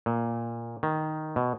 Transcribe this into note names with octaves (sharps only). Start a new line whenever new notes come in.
A#2
D#3
B2